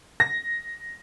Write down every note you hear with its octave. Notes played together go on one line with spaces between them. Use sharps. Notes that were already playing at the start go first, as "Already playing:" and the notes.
A#6